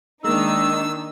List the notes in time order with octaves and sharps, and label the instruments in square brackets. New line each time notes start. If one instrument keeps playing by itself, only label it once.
[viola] D#3 D4 [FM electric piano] G#3 A#3 [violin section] D#4 [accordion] E6